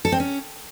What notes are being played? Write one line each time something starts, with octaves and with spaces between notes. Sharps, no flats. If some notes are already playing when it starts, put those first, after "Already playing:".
A4
C4
C#4